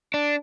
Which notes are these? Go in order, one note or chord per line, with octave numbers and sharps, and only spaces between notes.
D4